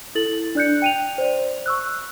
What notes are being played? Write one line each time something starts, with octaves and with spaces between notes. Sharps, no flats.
E4 A4 A6 F#7
D4 D5 F#6 G6 C#7
G5 D#7 F7
C5 D5
C#6 E6 F#6